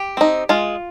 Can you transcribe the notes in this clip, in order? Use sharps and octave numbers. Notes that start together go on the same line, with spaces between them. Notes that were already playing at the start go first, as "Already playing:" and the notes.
Already playing: G4
C4 D#4
G#3 F4